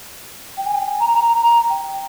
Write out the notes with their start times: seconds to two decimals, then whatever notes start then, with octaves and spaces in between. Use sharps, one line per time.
0.57 G5
0.66 G#5
0.74 G5
0.86 G#5
0.99 A#5
1.14 A#5
1.27 A#5
1.42 A#5
1.69 G5